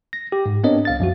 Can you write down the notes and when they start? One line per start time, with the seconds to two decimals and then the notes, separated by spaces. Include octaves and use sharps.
0.13 A#6
0.32 G4
0.46 G#2
0.64 B3 C4 D4 A#4 C#5 D#5
0.85 C2 F5 A6
1.00 F#2 F3 F#4